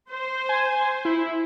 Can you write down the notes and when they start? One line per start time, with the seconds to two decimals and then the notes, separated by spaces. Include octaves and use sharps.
0.10 C5
0.49 G#5
1.05 E4